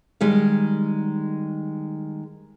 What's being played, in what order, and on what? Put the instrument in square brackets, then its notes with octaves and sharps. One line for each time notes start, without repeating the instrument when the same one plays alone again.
[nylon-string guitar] D#3 G3 G#3